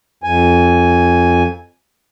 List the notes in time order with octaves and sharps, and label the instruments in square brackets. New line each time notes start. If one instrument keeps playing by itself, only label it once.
[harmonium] F2 G#5